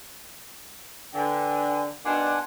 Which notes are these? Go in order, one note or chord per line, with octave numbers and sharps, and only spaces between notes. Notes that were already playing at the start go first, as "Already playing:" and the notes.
D3 B4 G5 G#5
B2 D#3 D4 F#5 G#5 A5 C6